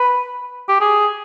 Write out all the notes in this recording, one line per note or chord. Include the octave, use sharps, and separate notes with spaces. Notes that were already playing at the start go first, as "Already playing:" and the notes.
Already playing: B4
G4
G#4